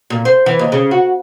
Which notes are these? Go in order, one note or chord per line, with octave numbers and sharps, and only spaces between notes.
A#2
C5
E3
D#2
C#3
F#4